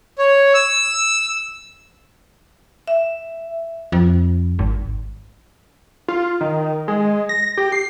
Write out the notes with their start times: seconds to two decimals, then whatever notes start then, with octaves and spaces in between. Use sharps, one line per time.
0.18 C#5
0.54 E6
2.87 E5
3.92 F2
4.59 G#1
6.08 F4
6.41 D#3
6.88 G#3
7.29 A#6
7.57 G4
7.72 C7